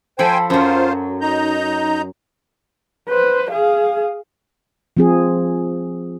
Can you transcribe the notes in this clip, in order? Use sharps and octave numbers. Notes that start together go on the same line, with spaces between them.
F3 A4 C5 G5 G#5 B5
F#2 F#3 F4 C5
D#4 A#5 G6
B4 C5
G#4 F5
F3 C4 G#4